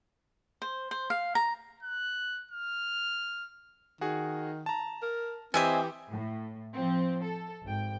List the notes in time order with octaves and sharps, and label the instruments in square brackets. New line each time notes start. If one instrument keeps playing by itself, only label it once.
[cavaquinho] C5
C5
F5
A#5
[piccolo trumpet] F#6
F6
[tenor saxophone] D#3 [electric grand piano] F#4 G#4
[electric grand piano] A5 A#5
[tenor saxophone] A#4
[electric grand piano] E3 G4 [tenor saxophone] C4 [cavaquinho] D#5 E5 G#5
[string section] A2
F3 C4
A4
G#1 G5